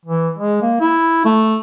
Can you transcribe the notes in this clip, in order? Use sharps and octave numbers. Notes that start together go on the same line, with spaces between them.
E3
G#3
A#3
E4
A3